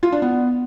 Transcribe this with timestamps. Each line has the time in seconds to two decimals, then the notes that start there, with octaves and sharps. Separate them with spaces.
0.03 F4
0.12 D4
0.22 B3